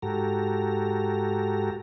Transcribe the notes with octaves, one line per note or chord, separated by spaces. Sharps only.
G#2 F#4 G4 A4 A#5